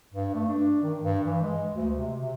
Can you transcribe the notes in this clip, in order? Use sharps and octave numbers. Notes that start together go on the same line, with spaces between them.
G2
A3
D4
D#3
G2
E3
G#3
D2
C3
C3